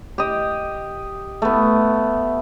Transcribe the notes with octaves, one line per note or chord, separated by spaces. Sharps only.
G4 D#5
A3 B3